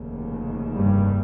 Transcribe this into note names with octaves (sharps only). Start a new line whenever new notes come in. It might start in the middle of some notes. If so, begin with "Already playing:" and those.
Already playing: F1 D#2 C#3
G2 G3